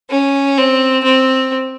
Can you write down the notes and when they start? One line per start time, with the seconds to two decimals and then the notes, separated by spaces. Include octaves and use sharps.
0.10 C#4
0.58 C4
1.04 C4